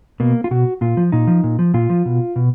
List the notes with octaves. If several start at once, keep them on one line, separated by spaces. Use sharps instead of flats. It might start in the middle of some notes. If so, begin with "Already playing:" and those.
B2 A#3
F4
B2 F#4
A#2 F4
F3
A#2 D#4
F3
A#2
F3
A#2 F4
F3
B2
B2